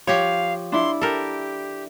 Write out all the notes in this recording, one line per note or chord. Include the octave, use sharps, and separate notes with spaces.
F3 G4 C#5 F5
D4 E4 C6
G4 A4 A#4